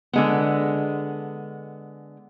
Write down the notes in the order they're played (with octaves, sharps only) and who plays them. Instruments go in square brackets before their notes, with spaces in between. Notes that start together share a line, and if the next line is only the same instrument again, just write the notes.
[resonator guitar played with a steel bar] D3 G#3 B3